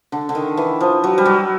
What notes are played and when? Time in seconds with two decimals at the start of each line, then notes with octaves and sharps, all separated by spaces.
0.12 D3
0.29 D3
0.35 D#3
0.57 E3
0.81 F3
1.04 F#3
1.18 G3
1.25 F#3